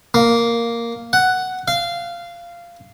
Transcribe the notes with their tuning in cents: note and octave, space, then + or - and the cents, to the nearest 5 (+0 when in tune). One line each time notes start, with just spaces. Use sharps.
A#3 +0
F#5 +5
F5 -15